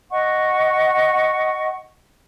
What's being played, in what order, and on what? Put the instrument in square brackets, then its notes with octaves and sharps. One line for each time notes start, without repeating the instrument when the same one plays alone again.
[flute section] D#5 F#5 C#6